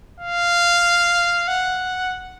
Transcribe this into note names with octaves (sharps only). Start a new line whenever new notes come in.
F5
F#5